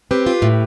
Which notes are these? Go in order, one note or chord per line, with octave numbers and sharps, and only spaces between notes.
C4 G4 B4
F4
A2